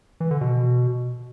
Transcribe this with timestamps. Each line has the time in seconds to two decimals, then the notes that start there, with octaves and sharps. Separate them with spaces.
0.20 E3
0.31 D3
0.41 B2